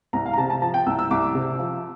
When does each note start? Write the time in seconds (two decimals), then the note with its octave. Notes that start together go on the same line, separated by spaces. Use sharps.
0.13 C2 A#5
0.26 F5
0.33 A#5
0.38 C3 A5
0.50 A5
0.62 F3 A5
0.74 G5
0.86 C2 E6
0.99 E6
1.11 C2 D6
1.35 C3
1.59 F3